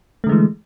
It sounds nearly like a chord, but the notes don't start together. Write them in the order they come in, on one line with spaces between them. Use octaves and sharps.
A3 D3 G#3 E3